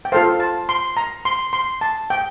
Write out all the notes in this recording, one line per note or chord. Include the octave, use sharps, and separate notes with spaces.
G5
F4 A4 C5 F5
A5
C6
A#5
C6
C6
A5
G5